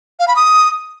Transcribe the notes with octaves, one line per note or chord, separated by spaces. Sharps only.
F5
B5
D#6